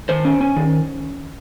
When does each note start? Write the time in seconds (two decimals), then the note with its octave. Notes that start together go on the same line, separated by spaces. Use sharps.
0.09 D#3 C5
0.25 C#4
0.41 C#4
0.56 D#3